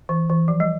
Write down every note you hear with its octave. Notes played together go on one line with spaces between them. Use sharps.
E3
E3
F3
G3